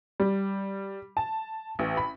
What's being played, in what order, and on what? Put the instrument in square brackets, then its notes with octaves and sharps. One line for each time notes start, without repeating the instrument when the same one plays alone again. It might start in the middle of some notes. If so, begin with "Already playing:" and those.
[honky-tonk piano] G3
A5
A1
B5